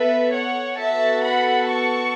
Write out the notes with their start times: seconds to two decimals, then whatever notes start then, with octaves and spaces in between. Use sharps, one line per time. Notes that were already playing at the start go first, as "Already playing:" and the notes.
Already playing: B3 A4 B4 E5
0.34 C#5 F#5
0.79 B3 F#4 A4 E5 A5
1.25 F#5 B5
1.71 A5 C#6